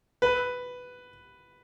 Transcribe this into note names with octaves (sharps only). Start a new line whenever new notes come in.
B4